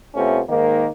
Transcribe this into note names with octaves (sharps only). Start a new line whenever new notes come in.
C3 A3 B3 C#4 F4
G#2 D#3 A#3